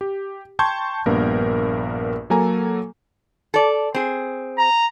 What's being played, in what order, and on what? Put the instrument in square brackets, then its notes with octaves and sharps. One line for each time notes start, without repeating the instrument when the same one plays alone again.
[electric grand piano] G4
G5 A5 C6 C#6 G6 G#6
A#1 G2 A#3 B3 A#4
F#3 A#3 A4 G#5 A#5
[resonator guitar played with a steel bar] A4 D5
C4 G#4
[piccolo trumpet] A#5